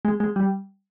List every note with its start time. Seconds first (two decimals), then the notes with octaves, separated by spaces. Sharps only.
0.05 G#3
0.20 G#3
0.36 G3